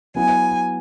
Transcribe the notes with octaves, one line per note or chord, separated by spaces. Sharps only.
F#3 B3 E4 G#5